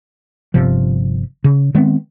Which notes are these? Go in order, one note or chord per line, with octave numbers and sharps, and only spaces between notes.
G1 C3 F3
C#3
D#3 G#3 B3 C4